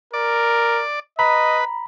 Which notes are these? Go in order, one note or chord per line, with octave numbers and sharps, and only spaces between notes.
A#4 D5
B4 D#5 A#5 B5